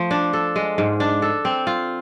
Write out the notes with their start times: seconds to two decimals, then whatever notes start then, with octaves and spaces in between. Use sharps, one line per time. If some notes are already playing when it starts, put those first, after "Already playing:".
Already playing: F3 A3
0.11 D4
0.33 A4
0.56 G#3
0.78 G#2
1.00 D4
1.22 A4
1.45 C4
1.67 F4